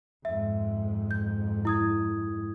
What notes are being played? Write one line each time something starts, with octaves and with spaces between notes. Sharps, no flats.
F2 G#2 E5
G6
E4 D#6 G#6